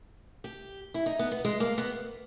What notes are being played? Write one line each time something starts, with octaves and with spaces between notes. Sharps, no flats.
G4
E4
D#4
B3
B3
G#3
A#3
B3